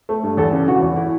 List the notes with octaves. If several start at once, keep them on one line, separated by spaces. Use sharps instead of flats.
A3
G2
E2 A4
C#3
E3 F#4
E2
E4